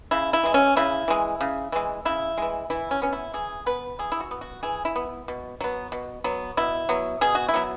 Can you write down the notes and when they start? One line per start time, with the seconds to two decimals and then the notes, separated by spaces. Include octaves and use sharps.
0.11 C#3 E4
0.33 E4
0.43 E3 G#3
0.54 C#4
0.77 C#3 E4
1.08 E3 G#3
1.41 C#3
1.72 E3 G#3
2.05 C#3 E4
2.38 E3 G#3
2.70 E3 E4
2.91 C#4
3.02 B3 C#4
3.13 E4
3.34 E3 G#4
3.66 B3 B4
3.99 E3 G#4
4.12 E4
4.20 F#4
4.31 B3
4.41 F#4
4.63 E3 G#4
4.85 E4
4.96 B3
5.28 B2
5.61 F#3 B3
5.92 B2
6.24 F#3 B3
6.57 B2 E4
6.89 F#3 B3
7.21 B2 G#4
7.35 F#4
7.49 E4
7.54 F#3 B3